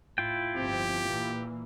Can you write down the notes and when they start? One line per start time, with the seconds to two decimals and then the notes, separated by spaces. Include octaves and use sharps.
0.18 A2 E4 F4 G5
0.55 G1 F3 C4 G4
1.07 A#2 E3 A#3